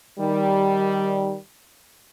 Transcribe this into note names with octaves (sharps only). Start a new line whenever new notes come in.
D#3 G3